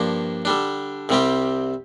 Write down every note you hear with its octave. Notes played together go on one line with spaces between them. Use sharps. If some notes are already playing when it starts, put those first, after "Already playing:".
Already playing: G2 F3 A#3 D4
D3 G3 D4
C2 C3 G3 C4 G4